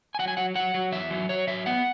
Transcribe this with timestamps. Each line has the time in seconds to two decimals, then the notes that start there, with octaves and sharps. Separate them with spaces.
0.15 G#5
0.19 F#3 F#5
0.28 G#5
0.37 F#3 F#5
0.55 F#3 F#5
0.74 F#3
0.92 E2 E5
1.11 F#3
1.29 F#3 C#5
1.47 F#3 E5
1.66 B3 F#5